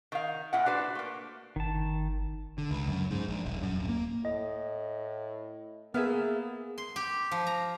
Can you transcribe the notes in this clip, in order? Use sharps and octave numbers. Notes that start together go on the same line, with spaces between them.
D#3 F5
A#2 E4 F#5
D4 F#4 B4 C5
A3 A#3
G1 D#3 A5
D3
C#2
F#2
G#2
A#1
D#1
F#2
D1
A#3
A2 D#5
A#3 B3 G#4 E5 F5
C6
G4
F3
A#5